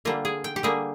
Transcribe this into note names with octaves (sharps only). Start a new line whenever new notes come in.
D3 G3 A#3 F4
G#4
G5
G4
D3 G3 A#3 G#4